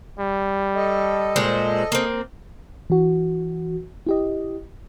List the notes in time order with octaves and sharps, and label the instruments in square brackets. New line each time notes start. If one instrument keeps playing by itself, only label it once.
[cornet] G3
[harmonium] A4 D#5
[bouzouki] A#2 G#3 C5
A#3 C4
[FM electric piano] E3 F#4
E4 G4 D#5